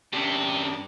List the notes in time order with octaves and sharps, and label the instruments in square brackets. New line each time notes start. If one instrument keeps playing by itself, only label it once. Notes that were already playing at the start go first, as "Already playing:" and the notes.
[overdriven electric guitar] G2 A5 [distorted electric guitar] C3 [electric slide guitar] C#4 D4 G4